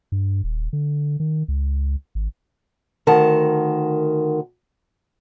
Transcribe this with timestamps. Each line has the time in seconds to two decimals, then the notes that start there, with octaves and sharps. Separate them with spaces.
0.12 G2
0.44 D#1
0.73 D3
1.20 D#3
1.48 C#2
2.15 G#1
3.07 D2 D#3 A#4 F#5 A5